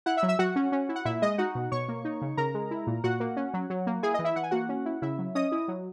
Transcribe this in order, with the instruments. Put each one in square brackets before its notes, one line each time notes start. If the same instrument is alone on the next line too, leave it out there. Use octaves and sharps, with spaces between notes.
[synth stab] E4 F#5 F#6
E5 E6
F#3
E5 E6
F#3 F#4 F#5
C#4
C#4
E4
F#5
A#2 E4 E5
G#3 D#5
D#4 F#4 F#5
B2
B2 C#5 C#6
A#3
D#4
C#3
C#3 A#4 A#5
G#3
E4
A#2
A#2 F#4 F#5
A#3
C#4
F#3
F#3
A#3
E4 G#4 G#5
E3 D#5
E4 E5
E3 F#5
G#5
A#3 F#4 F#5
C#4
E4
C#3 E4 E5
F#3
C#4 D#5 D#6
E4
F#3